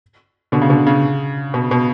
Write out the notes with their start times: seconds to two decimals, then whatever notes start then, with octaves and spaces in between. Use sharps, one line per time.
0.52 B2 D3
0.61 C#3
0.70 B2 D3
0.86 C#3
1.54 B2
1.71 B2